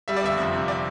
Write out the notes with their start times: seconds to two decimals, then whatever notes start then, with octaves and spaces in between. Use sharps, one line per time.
0.08 G3 E5
0.17 D5
0.23 G1 E5
0.38 F2
0.54 C3
0.68 D5